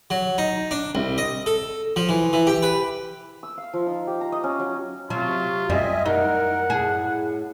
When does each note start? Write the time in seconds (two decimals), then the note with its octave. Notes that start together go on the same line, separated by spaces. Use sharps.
0.10 F#3
0.38 D#4
0.71 D4
0.95 C2
1.18 D#5
1.46 A4
1.96 F3
2.09 E3
2.33 E3
2.47 G4
2.63 B4
3.43 E6
3.58 F5
3.73 F3
3.86 D#4
4.07 G4
4.21 A#5
4.32 D#5
4.44 C#4
4.59 F#3
5.10 C3 F#3 F4
5.69 F#2 G3 D#5 E5 G#5
6.05 D#4 A#4 F#5
6.70 A2 G#4